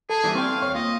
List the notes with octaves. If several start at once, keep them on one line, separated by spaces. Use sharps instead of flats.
G#4 A4 A5
E3 G3
C4 F5 G5 C6 C#6
D#2 C#5 C#6
A#3 F4 D#5